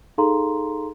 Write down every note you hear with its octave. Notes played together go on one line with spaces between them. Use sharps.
D#4 G#4 A4 F5 A#5 C6